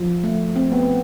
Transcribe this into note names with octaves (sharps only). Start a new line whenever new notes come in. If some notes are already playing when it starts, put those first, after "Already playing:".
Already playing: F3
A3
C4
B3